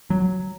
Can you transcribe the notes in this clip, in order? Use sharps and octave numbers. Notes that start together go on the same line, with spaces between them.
F#3